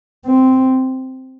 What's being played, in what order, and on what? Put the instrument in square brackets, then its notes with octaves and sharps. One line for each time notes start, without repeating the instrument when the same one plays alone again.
[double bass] C4